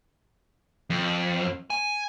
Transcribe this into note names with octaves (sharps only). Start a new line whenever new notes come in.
F2
G#5